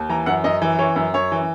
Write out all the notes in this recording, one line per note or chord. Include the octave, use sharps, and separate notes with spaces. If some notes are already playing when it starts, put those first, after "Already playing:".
Already playing: D#2
E3 A#5
F#2 F#5
F#2 D#5
E3
E3 C#5
F#2
F#2 C#5
E3